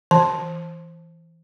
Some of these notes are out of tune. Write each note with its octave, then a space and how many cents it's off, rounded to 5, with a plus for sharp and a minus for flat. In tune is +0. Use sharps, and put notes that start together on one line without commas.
E3 +0 A5 -5